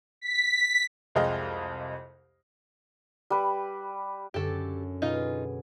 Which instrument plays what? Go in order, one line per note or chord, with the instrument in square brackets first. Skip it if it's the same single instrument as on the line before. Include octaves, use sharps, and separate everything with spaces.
[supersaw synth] B6
[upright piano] C2 F2 G#3 D#5 F5 G5
[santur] G3 B4
[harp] F#2 D3 C#5 [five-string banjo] G4 A4
[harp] B2 G#4 [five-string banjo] D#4 F4